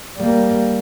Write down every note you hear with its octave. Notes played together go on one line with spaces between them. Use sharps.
G3 A#3